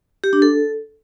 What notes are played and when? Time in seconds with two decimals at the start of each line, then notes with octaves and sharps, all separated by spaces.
0.24 G4
0.33 D4
0.42 A4